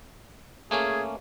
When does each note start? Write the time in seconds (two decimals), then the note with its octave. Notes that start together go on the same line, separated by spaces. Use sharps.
0.71 A3 A#3 C#4 G#4